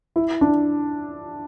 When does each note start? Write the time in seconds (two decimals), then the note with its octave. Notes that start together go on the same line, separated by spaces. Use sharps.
0.16 E4
0.41 D4